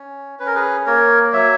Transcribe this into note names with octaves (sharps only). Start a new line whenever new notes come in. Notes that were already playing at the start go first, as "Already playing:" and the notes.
Already playing: C#4
C#4 B4
A#4
G#4 B4
A#3 A#4 C#5
F#3 C#5 E5